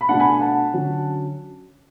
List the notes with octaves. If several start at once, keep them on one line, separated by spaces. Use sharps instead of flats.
B5
B2 A3 D4 F#5 A5
G#5 B5
F#5 A5
D3 F#3 C#4